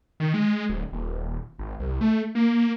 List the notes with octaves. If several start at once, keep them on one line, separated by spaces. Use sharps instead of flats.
D#3
G#3
D1
D#1
G#1
C2
A3
A#3